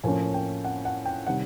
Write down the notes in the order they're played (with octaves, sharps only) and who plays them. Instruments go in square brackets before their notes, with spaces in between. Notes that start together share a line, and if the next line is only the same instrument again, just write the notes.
[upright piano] A2 F3 A#3 C#4 G#5
G5
F#5
F#5
G5
C3 D#3 G3 F#5